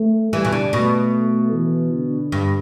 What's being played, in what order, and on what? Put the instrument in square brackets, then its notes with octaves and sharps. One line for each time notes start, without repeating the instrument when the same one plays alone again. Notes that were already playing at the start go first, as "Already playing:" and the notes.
Already playing: [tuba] A3
[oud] E3 [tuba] G3
[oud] B2
D3
[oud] B2 [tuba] A3
[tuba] E3
D3
[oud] G2